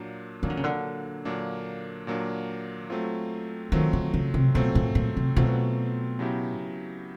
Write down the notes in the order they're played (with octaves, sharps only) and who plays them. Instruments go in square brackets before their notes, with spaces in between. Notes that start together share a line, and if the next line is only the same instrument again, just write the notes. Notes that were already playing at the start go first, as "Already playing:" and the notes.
Already playing: [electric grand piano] A#2 F#3 A#3 D4
[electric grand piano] A#2 F#3 A#3 D4 [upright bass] D#3
[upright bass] D3
C#3
D3
[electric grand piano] A#2 F#3 A#3 D4
A#2 F#3 A#3 D4
F#3 A3 C4 F4
[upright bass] D#3 [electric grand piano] F#3 A3 C4 F4
[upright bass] D3
C#3
C3
[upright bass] B2 [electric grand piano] F#3 A3 C4 F4
[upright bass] A#2
A#2
C3
[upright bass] B2 [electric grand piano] F#3 A3 C4 F4
[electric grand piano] C#3 F#3 B3 E4 G4